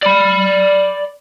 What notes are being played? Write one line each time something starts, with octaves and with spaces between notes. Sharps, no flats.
D5 B5